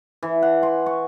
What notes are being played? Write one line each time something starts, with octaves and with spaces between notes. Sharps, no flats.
E3
F#5
C6
C#6